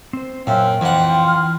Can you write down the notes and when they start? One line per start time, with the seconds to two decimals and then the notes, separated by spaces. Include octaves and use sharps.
0.13 C4 C5
0.47 F#2 A#2 C5 E5 F5 G5
0.81 F2 E3 F4 F#5 C6
1.27 F6